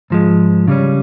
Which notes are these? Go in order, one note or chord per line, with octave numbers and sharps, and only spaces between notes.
G#2 F3 G#3
C#3 G3 C#4